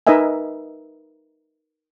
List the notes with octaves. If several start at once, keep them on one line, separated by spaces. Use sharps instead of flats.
D#4 A#4 B4 D#5 E5 G#5